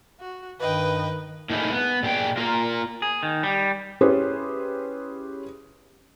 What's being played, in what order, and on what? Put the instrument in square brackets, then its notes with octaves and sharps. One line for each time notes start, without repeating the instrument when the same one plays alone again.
[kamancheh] F#4
[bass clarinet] G2 [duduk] D#3 [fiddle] B4 [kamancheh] D#5 G5
[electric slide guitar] A2 A#3 D#4 E4 G#4
B3
A#2 G4 G#4 G5
A#3 F4 A#4
[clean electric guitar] G#4
D#3
G3
[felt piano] C#4 E4 G4 G#4 B4 C5